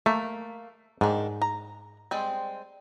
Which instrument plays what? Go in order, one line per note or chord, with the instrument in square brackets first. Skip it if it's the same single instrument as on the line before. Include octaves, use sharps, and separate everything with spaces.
[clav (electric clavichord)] A3 [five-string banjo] A#3
[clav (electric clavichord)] G#2 [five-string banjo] D#3 D4
[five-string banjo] A#5
G3 G#3 C4